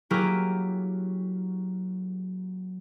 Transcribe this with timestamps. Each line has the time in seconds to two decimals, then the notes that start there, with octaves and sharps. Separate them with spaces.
0.10 F#3 A#3 E4 G4 G#4 A#4